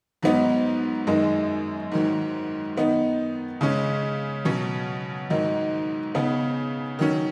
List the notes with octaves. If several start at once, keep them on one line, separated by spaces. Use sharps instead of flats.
G#2 F#3 B3 D#4
F#2 D#3 G#3 D#4
G#2 D#3 F#3
D#3 B3 D#4
C#3 G#3 C#4
B2 F#3 C#4
G#2 D#3 F#3 D#4
C#3 B3 D#4
D#3 F#3 C#4